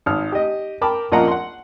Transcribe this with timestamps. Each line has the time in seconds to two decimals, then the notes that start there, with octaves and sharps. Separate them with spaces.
0.06 G#1 F6
0.32 G4 D#5
0.81 A#4 G5 A5 B5 D6
1.12 A#1 A#3 F4 D#5 F#5 A#5
1.28 F#5 C6